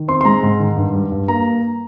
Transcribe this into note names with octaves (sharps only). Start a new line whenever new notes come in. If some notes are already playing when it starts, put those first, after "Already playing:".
Already playing: D#3
C4 C6
C6
G#3 A#5
G#2
D#3
G2
G3
G2
A#3 A#5